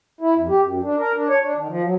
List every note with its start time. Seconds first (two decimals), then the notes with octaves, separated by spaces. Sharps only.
0.21 E4
0.36 F2
0.49 G4
0.62 F#2
0.83 D4
0.98 A#4
1.15 D4
1.28 C#5
1.43 D4
1.56 D#3
1.69 F3
1.83 F#3